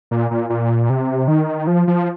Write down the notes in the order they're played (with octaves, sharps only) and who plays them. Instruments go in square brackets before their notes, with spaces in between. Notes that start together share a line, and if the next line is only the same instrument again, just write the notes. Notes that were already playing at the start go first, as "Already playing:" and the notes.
[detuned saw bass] A#2
A#2
A#2
C3
D#3
F3
F3